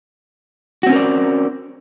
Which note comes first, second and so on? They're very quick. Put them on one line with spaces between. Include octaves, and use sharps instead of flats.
F#4 C4 C#4 A#4 D5